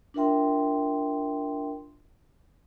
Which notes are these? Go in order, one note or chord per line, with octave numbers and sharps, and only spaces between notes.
D4 F4 A#4 E5 G5 C6